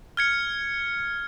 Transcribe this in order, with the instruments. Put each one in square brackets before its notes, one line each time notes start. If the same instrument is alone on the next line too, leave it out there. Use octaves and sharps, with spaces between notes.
[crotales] F6 G#6 C#7